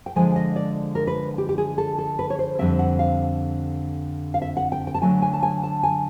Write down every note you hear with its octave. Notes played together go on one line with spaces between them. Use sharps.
G5
D3 F3 G#3 G#5
D#5
D5
A#4
B4
G4
G4
G#4
A4
A4
B4
C#5
C5
F2 D3 G3 C4 E5
F#5
F5
F5
E5
F#5
G5
G5
A5
D3 F#3 A3 G#5
G#5
A5
G#5
A5
G#5